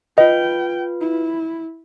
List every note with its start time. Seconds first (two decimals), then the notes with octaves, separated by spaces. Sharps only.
0.18 F4 B4 D#5 G5
1.01 E4